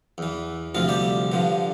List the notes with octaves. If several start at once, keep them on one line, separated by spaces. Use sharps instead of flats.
E2 E3
D2 C3 F3 F4
G3 G4
G2 D3 F3